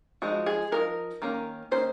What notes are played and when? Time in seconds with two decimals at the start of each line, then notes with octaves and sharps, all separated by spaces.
0.22 F3 G#3 D#4 F#4
0.46 G#4
0.72 F3 G#3 D#4 A#4
1.22 D#3 A#3 C#4
1.71 D#3 A#3 C#4 C5